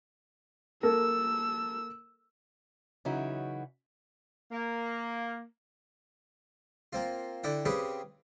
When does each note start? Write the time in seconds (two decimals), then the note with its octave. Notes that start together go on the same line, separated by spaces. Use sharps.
0.83 A#3 A4 A#4 E6
3.05 C#3 E3 F#3 D#4 E4 F#4
4.51 A#3
6.93 A#3 C4 F4
7.44 D3 E4 D5 F#5 G5
7.65 C#3 C4 G4 G#4 B4